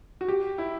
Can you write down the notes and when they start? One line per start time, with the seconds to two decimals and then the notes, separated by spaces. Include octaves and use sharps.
0.21 F#4
0.28 G4
0.58 E4